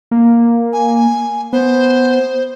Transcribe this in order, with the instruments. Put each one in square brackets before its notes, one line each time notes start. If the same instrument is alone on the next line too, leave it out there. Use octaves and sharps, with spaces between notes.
[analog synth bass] A#3
[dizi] G#5
[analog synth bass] B3 [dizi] C5